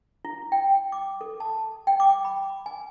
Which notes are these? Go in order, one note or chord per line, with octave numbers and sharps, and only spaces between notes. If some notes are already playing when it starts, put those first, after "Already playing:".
E4
G5
D6
A4
A5
G5
D6
B5
G#5